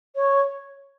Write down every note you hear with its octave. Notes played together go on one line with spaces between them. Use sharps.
C#5